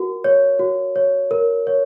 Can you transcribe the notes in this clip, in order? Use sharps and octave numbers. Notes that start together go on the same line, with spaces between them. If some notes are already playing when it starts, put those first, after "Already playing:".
Already playing: F#4 A#4
C#5
F#4
C#5
A#4
C#5